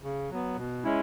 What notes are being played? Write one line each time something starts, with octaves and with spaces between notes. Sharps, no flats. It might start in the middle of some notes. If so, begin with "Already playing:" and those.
C#3
F#3 B3
B2
G#3 C#4 E4